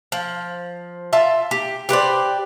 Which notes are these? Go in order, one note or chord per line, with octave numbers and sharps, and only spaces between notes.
F3
F4 E5 A5
G4
G4 B4 C5 D5